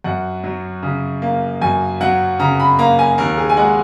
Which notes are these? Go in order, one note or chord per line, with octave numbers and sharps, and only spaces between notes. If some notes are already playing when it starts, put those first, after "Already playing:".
F#2 F#5
F#3
C#3
A#3
F#2 G#5
F#3 F#5
C#3 A#5
B5
A#3 A#5
G#5
D#2 A#4
G#4
G#5
G#3 F#5